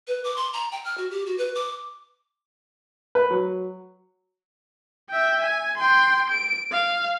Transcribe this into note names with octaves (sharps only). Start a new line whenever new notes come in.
B4
D6
C6
A#5
G5
F6
F#4
G4
F#4
B4
D6
B4
F#3
E5 G5
G#5
G5 C6
D7
F5